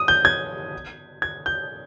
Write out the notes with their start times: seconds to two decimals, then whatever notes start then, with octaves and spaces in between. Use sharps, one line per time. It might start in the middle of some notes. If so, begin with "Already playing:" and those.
Already playing: D#6
0.08 G6
0.25 G#6
1.22 G#6
1.46 G6